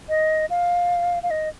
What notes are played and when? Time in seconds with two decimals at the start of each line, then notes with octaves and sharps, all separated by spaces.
0.09 D#5
0.50 F5
1.23 F5
1.31 D#5